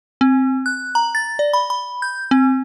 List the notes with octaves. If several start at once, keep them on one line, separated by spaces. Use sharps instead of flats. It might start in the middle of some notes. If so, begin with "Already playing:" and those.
C4
F#6
A#5
A6
D5
B5
B5
G6
C4